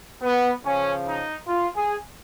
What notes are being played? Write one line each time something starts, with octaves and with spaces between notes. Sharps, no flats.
B3
C#3 F3 C#4
D#4
F4
G#4